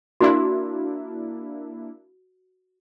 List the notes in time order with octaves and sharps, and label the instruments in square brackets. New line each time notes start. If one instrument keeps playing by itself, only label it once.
[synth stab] A#3 D4 E4 [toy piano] F#4